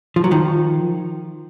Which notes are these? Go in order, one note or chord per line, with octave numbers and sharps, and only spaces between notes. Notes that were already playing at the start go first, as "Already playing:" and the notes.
F3
F#3
D#3 F3